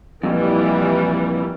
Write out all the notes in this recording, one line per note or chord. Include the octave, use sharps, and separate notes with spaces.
F2 A#2 E3 G3